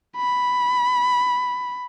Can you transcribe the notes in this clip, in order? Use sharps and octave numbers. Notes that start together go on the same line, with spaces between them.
B5